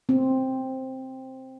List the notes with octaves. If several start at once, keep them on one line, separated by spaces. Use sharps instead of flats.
C4